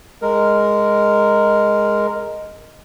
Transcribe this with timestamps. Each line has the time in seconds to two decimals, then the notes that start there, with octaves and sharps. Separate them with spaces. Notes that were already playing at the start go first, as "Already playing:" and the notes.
0.22 G#3 A#4